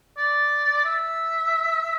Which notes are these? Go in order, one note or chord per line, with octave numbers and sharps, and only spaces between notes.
D5
E5